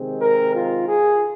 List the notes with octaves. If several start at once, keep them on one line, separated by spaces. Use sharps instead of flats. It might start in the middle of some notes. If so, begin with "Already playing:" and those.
Already playing: C3 D#3 G#3 C4
A#4
F4
G#4